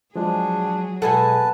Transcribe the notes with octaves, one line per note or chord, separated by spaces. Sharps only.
F3 F#3 G#3 D4 G#4
B2 G#3 A4 B4 F#5 G#5 A5